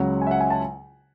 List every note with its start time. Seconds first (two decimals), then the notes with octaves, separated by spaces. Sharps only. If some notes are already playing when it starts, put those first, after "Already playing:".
Already playing: C#2 C#3 F#3 F#5
0.22 G#5
0.27 E5
0.31 F#5
0.40 G#5
0.50 A5